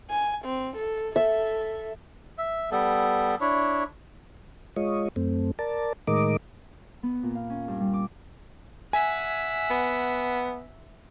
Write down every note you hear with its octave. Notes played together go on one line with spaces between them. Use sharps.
G#5
C4
A4
A4 E5
E5
G3 B3 A4
D4 E4 C#5
G#3 F4 C#5 D#5
F#2 A3 C4
A#4 D5 A5
A2 D#3 G#3 A#4 D#5 D6
B3
A#2
F5
C#4
G2
G3
D6
E5 F#5 G#5
B3